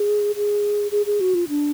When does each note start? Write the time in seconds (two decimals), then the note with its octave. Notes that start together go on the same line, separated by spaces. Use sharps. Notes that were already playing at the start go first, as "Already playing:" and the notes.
Already playing: G#4
0.36 G#4
0.91 G#4
1.06 G#4
1.20 F#4
1.34 F4
1.49 D4